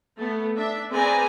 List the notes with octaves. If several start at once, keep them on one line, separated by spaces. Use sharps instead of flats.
A3 B3
D4 E5
C4 G#4 B4 D5 G#5 A#5